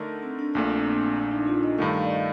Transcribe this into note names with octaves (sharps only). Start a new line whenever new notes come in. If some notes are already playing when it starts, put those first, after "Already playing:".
Already playing: D3 A3 D#4 A#4
C4
D4
A#1 A#2 A3 D4
C4
A#3
C4
D4
D#4
F4
D#5
G2 D#3 A3 F5
F5
D5
D#5